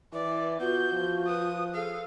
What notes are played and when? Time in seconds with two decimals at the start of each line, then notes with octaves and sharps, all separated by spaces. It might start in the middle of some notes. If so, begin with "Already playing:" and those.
0.13 E3 B4 D5
0.60 B3 F4 F#4 G6
0.92 F3
1.26 B4 D#6
1.74 G#4 A4 F5